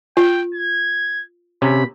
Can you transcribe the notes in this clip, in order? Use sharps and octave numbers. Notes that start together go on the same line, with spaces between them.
F4 G5
G#6
C3 C#4 B5